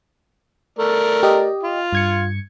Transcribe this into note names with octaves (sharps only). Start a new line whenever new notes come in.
A3 A#4 D5
G4 D#5
F4
G2 G#6 C#7